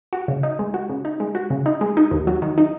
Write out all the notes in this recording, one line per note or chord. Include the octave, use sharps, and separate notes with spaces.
F#4
C#3
D#4
G#3
F#4
C#3
D#4
G#3
F#4
C#3
D#4
G#3
D#4
D#2
F#3
D#3
D#4